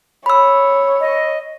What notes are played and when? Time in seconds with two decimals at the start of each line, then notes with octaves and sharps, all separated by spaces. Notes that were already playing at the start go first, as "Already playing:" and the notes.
0.26 C#5 B5 E6
1.01 D#5